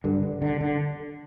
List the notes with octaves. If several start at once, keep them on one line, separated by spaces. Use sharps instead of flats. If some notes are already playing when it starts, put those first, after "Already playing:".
G2 D3
D3
D3
D3